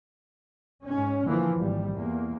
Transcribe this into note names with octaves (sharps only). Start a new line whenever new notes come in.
G#2 C#4
D3 E3 F3 A#3
G#1 G3
E2 A#3